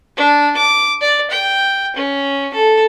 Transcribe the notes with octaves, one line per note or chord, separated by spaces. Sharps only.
D4
D6
D5
G5
C#4
A4